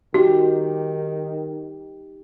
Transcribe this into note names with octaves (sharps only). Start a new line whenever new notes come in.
D#3 D#4 F#4 G4